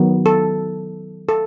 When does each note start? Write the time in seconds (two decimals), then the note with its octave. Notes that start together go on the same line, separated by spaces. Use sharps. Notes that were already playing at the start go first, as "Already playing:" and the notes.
Already playing: D#3 F#3 B3
0.26 A4
1.29 A4